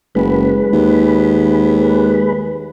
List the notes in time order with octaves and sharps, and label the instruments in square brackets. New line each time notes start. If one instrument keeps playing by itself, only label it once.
[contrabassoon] F#1 [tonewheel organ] G#3 B4
[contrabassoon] D#2